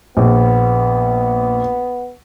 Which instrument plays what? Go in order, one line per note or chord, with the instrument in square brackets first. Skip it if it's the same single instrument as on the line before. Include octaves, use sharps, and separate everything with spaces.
[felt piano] A#1 [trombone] B3